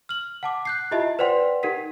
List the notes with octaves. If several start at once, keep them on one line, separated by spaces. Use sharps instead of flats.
F6 F#7
F#5 A5 D6
F#6 G6 C7
E4 F4 G4 D#5 E5 A5
B4 C5 D5 F#5 G5 C6
D#4 G4 A#4 F#5 B6